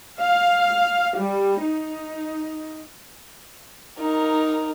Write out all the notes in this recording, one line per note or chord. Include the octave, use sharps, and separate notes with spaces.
F5
G3
D#4
D#4 A#4